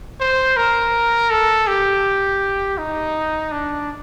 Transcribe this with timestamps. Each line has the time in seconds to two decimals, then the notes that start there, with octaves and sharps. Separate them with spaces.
0.21 C5
0.57 A#4
1.31 A4
1.67 G4
2.78 D#4
3.52 D4